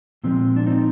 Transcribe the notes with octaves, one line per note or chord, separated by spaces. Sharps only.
A#2 F3 G#3 C4
D4
C4 D#4